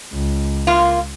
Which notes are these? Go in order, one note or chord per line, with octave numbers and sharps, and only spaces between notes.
C#2
A#3 F4